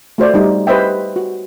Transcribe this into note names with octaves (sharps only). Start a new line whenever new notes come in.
A3 F#4 C5 D5
G3 D#4
G4 B4 C5 D#5 E5 G5
F#4